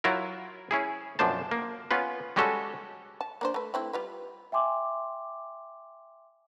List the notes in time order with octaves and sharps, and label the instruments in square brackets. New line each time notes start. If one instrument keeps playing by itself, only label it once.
[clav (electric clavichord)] F#3 E4 F4 A#4
C#4 E4 G#4
F#2 B2 F3 D4 C5 A5
A#3
B3 C#4 F4 B4
G3 G#3 C#4 F#4 A4
[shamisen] A5
A#3 D4 C5
A3 B4
A3 C4 E4
G3 F4 B4
[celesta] E5 G5 G#5 C6 D6